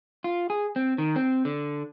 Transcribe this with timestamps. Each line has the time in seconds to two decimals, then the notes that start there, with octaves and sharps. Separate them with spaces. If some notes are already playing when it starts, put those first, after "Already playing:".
0.24 F4
0.50 G#4
0.76 C4
0.98 D#3
1.16 C4
1.45 D3